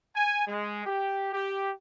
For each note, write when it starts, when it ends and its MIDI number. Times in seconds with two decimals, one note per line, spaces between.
0.16 0.43 80
0.48 0.84 56
0.85 1.30 67
1.33 1.71 67